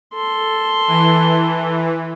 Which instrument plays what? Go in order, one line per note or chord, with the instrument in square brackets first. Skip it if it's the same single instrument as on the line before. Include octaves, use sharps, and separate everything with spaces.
[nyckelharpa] A4 C6
[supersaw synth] E3